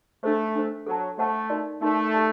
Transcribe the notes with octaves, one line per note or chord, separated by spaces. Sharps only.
A3 D4 A4 C5
D4 A4 C5
F#3 A4 C5 F#5 A5
A3 A4 C5 F#5 A5
D#4 F#4 A#4 D5
A3 D#4 F#4 A#4 D5
G4 D5 A5